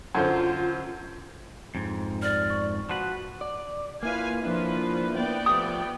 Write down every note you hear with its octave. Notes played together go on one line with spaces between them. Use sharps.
F#2 D3 F4 C5
F2 G#2
D5 F6
C#6
F3 F#4 B4 F#5 F#6 F#7
D5
A#3 E4 F4 B4 F5 G#5
F3 A#3 D4 E4 B4
B3 D5 G5
F3 A3 G4 D#6